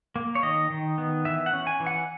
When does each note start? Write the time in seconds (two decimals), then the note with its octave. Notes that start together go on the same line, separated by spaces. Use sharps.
0.16 A#3
0.35 C#5
0.43 D#3 D#5
0.70 D#3
0.98 B3
1.25 E3 E5
1.46 F#5
1.53 C#4
1.67 G#5
1.80 E3
1.87 F#5